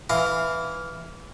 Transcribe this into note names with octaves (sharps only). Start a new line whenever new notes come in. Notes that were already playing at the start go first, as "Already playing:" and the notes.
E3 F5